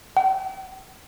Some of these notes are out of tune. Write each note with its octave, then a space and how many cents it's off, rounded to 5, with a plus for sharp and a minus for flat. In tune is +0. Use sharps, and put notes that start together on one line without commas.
G5 -45